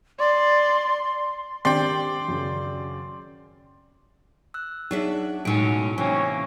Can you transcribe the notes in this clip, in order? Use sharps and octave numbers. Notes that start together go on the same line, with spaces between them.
D5 C6
D#3 C4 D4 G4 C5 D5 G5 C6
F#2 C#3
E6 F#6
F#3 D4 D#4 G#4 E5
B1 A2 F#3 G#3 C#4 D#4 D7
C3 E3 A#3 C#4